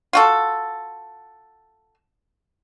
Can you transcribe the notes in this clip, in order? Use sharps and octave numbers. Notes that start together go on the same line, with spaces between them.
F4 F#4 A4